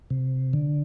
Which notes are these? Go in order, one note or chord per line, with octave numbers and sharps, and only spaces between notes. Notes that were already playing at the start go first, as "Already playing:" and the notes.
C3
D3